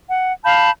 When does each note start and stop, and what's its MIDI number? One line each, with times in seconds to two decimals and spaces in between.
0.08 0.33 78
0.45 0.70 77
0.45 0.70 81
0.45 0.70 83
0.45 0.70 91